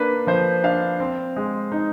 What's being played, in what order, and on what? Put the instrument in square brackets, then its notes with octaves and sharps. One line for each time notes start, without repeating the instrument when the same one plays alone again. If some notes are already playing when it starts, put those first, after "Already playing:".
Already playing: [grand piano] A#3 D4 B4
F3 C5
D4 F5
C4
G#3
D#4